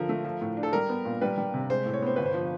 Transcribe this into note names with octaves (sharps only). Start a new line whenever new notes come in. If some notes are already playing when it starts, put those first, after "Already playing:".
Already playing: D3 F3 A#4
A3
F3
A2
D4
A4
G3 A#4
B3
A#2
G3 B4
G3
C3
G#3 C5
A2
C#5
B3 C5
G1 B4
C5
F3